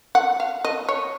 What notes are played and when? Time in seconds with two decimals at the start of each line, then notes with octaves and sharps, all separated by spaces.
0.15 F#5
0.40 F5
0.65 D#5
0.89 C#5